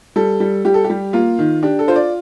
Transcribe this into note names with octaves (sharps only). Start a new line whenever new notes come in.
G3 A4
G3
G3 G4
A4
G4
G3
A#3 F4
D#3
D4 G4
A4
F4 C5
D5